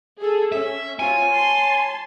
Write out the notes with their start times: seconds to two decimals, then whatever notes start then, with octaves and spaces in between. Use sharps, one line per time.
0.19 G#4 A4
0.52 C#4 E5
0.99 C4 F4 C#5 G#5
1.33 C#5 A5 C6